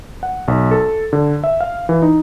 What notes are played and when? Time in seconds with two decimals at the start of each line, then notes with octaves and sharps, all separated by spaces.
0.23 F#5
0.48 B1
0.71 A4
1.13 D3
1.44 E5
1.61 F5
1.89 E3
2.02 D#4